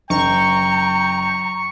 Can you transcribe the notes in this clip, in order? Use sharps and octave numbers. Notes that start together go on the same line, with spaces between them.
F#1 G5 A#5 C#6